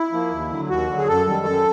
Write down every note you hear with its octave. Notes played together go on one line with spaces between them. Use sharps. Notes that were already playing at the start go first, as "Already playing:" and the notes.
Already playing: E4
F3 A#3
D#2
D3 F#3
D#2 F#4
D3 F#3
G#4
F#2 A4
D#3 G3
F#2